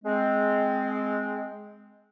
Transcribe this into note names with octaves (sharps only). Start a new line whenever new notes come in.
G#3 C4